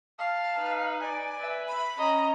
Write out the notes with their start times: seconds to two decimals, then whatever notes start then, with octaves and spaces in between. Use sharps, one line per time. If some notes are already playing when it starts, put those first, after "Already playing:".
0.19 F5 A5
0.57 D#4 B4
1.01 D5 G#5
1.38 B4 E5
1.68 B5
1.98 C#4 D#5 A#5